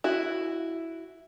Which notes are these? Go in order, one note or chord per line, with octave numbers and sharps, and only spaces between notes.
E4 F#4